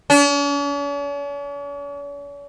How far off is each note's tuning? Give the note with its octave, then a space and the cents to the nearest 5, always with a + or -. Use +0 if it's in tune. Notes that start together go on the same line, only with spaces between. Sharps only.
C#4 +45